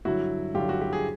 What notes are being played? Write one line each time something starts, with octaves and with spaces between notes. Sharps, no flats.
G2 D3 F#3 E4 F#4
G2 D3 F#3 F4 G4
F#4
G4
G#4